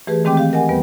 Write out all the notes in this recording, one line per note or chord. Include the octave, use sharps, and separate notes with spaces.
E3 A3 G4 G#4 B4
D#3 G#3 C4 G4 G5 D6
G4 F5
A#4 D#5 F#5 G#5
E2 G3 B3 B4